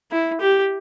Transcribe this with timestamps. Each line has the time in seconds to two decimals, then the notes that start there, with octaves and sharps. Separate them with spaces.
0.11 E4
0.41 G4